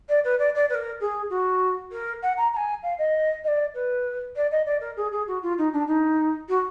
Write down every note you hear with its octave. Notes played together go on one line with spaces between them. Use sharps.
D5
B4
D5
D5
B4
A#4
G#4
F#4
A#4
F#5
A#5
A#5
G#5
F5
D#5
D#5
D5
B4
D5
D#5
D5
A#4
G#4
G#4
F#4
F4
D#4
D4
D#4
F#4